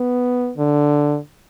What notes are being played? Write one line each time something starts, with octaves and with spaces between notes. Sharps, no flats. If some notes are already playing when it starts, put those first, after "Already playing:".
Already playing: B3
D3